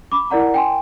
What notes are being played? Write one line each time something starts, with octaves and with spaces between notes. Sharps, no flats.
B5 D6
E4 A#4 D5 F#5 A#5
G5 G#5 C6